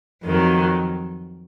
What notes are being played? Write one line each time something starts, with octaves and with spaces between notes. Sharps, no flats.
F2 D#3 F#3